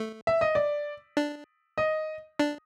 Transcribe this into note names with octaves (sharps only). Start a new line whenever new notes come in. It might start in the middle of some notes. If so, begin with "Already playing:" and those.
Already playing: A3
E5
D#5
D5
D4
D#5
D4